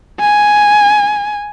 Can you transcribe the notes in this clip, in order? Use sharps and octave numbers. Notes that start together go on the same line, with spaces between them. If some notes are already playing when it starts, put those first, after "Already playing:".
G#5